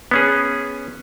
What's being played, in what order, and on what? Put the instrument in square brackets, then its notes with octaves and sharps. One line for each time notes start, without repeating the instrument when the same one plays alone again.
[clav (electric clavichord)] B3 C#4 G#4